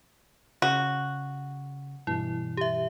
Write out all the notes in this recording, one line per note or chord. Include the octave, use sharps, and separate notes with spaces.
C#3 F#4
G2 B2 E3 E4
G4 E5